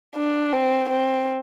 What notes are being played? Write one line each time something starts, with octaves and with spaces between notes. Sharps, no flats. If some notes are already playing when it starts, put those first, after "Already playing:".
D4
C4
C4